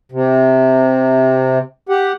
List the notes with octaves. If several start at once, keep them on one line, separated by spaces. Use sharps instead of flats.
C3
G4 F#5